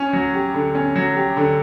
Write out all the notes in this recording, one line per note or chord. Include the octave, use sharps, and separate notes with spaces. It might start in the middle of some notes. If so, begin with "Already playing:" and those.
Already playing: C#4
F#3
G4
D3
C#4
F#3
G4
D3